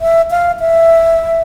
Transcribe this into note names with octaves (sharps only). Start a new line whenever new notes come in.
E5
F5
E5